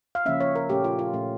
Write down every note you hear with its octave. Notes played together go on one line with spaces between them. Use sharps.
F5
C#3 F3 A#3 C#4 E5
C#5
A#4
A#2 A3 C#4 G4
F4
F4
A#2 A3 C#4